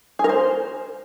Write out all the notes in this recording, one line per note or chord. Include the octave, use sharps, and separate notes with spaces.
G#4
A#4
C5